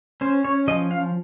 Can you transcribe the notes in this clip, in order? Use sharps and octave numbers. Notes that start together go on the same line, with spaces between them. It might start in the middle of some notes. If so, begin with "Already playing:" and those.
C#4 C5
C#5
F3 D#5
F5